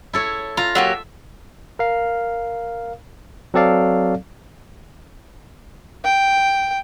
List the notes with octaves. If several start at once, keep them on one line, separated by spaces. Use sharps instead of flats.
E4 A4 C#5
F4 A#5
F#3 A#3 G4 E5
A#4 F5
F#3 C4 A4 D5 F5
G5